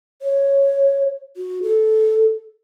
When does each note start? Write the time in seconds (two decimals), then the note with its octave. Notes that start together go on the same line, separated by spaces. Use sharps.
0.22 C#5
1.37 F#4
1.63 A4